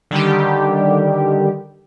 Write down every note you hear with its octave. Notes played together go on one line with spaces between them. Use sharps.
D3 D#3 G3 G4